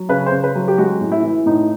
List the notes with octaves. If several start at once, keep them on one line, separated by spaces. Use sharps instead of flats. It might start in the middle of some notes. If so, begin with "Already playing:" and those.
Already playing: F#3
C#3 B4
C5
C#3
B4
F#3
G4
G#3 F#4
A2
E4
E3
A2 D#4